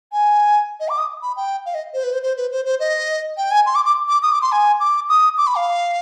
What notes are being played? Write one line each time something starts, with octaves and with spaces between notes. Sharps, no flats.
G#5
D#5
D6
D#6
B5
G5
F5
D#5
C5
B4
C5
C5
B4
C5
C5
D#5
G5
G#5
C6
D6
D6
D6
D#6
D6
C6
G#5
D6
D#6
D6
B5
F5